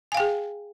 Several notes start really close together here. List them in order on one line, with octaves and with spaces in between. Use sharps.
G#5 F5 G5 G#4